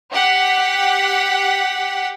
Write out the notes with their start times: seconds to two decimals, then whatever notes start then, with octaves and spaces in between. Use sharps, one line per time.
0.12 G4 F#5 B6